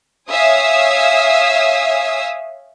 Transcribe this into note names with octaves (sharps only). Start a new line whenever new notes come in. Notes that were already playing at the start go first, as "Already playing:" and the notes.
C#5 E5 F5 G#5 D#6 E6